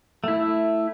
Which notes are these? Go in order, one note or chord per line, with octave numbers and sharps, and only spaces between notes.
A3 E4